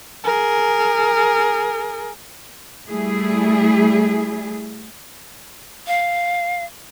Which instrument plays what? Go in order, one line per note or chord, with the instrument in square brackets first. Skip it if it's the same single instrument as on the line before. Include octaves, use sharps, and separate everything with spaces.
[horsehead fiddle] G#4 A#4
[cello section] G3 A3 E4 G#4
[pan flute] F5